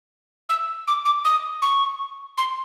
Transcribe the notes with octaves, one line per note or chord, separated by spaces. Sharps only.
E6
D6
D6
D#6
C#6
C6